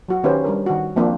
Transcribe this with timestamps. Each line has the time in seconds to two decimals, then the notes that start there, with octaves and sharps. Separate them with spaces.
0.08 F#3 F#4
0.24 D#3 C#4 D#4 G4 B4 C5
0.44 G3 D4 A#4
0.66 D#3 F#4
0.96 F3 A#3 C4 D4